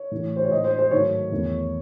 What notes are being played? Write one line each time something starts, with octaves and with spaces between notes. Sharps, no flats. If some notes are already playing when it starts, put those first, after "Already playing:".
Already playing: C#5
A2 E3 A3
C5
C#5
A2 G#3 D#5
C5
C5
G#2 D#3 F#3 A3 C#5
E2 D#3 A3